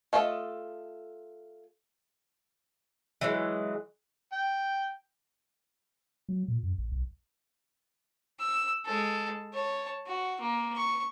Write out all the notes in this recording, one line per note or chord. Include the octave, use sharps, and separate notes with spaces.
A3 F4 A4 C#5 D#5
E3 F#3 G#3
G5
F#3
A#2
F#2
A1
B1
E6
G#3 A4
C#5 A5
F#4
A#3
C#6